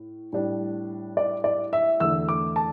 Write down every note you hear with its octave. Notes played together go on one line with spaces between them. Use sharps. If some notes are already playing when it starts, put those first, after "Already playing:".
Already playing: A2
A2 G3 D4
D5
D5
E5
E2 D3 A3 E6
D6
A5